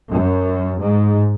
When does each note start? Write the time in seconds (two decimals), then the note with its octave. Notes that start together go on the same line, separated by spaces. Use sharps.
0.11 F#2
0.81 G#2